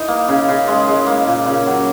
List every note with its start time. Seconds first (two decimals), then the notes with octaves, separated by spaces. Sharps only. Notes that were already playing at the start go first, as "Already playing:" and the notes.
Already playing: E3 D#4
0.08 A#3
0.28 C#3
0.48 C#3
0.68 G#3
0.87 G#3
1.07 A#3
1.27 A#2
1.46 C#3
1.67 F#3